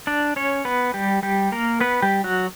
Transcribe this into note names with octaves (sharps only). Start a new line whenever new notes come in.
D4 D5
C#4 C#5
B3 B4
G3 G4
G3 G4
A#3 A#4
B3 B4
G3 G4
F#3 F#4